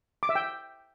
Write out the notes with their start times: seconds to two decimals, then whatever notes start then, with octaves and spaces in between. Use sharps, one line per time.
0.23 D6
0.29 E5
0.35 G5